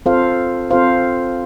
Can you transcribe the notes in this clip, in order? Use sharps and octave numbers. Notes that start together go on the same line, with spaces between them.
C4 F4 A4 C5 F5
C4 F4 A4 C5 F5